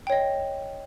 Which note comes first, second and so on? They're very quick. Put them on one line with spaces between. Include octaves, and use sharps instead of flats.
G5 C#5 D#5